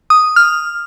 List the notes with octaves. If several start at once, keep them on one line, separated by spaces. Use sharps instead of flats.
D#6
F6